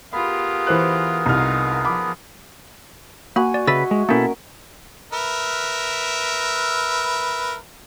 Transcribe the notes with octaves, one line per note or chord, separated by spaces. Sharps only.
B3 F4 G4 G#4 A#4 B5
E3 C5 F#6
C2 D#4 F4 F6
F3 B5 D6
A#3 F#4 G#5 B5
D5
C#3 B4 D#5 E5 E6 A6
G#3
B2 A#3 C#4 E4 A4 A#4
A#4 B4 E5